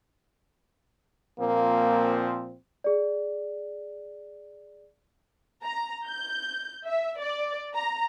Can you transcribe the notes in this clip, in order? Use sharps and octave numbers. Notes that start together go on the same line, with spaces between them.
A#2 F3 A#3 C4
G#4 D5
A#5
G6
E5
D5
A#5